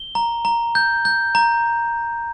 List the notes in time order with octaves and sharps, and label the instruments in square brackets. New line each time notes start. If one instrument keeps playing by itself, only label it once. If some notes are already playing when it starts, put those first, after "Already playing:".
Already playing: [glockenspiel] G7
A#5
A#5
G6
G6
A#5